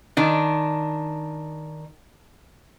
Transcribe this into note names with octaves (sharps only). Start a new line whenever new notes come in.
D#3 D4